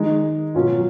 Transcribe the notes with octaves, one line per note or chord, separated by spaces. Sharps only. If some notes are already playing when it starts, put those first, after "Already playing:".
Already playing: D#3 G#3 D#4
B2 F#3 C#4 F4